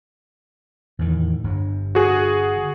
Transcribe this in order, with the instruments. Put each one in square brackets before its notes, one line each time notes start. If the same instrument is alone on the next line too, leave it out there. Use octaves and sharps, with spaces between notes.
[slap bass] E2 A2 D#3
G1 G2
[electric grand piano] F#4 G#4